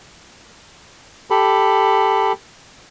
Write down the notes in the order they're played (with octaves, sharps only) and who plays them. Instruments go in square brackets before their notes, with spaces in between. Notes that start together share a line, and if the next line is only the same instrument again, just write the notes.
[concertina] G4 A4 B5